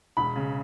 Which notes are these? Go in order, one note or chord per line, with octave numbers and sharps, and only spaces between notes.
E1 B5
C#3